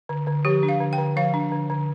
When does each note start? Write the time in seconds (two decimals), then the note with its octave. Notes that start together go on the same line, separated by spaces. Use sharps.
0.09 D3
0.27 D3
0.45 F3 G4
0.63 D4
0.69 F5
0.81 D3
0.93 G5
0.98 D3
1.17 F3 F5
1.34 D4
1.52 D3
1.70 D3